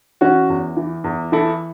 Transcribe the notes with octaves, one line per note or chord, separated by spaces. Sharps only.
E3 C#4 F#4
E2
E3
E2
E3 E4 A4